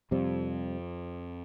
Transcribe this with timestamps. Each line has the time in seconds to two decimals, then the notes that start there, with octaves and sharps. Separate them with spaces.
0.11 F2 C3 G3 C4